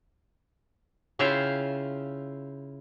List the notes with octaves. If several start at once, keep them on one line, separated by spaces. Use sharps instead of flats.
C#3 E4 F4 E5 F5 G5